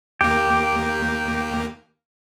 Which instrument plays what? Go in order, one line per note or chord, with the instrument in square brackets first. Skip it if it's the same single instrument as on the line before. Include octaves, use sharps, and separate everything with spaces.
[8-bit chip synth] D#2 A#3 [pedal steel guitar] G4